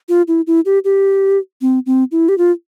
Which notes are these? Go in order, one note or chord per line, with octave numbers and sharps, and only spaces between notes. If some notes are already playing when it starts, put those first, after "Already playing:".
F4
E4
E4
G4
G4
C4
C4
E4
G4
F4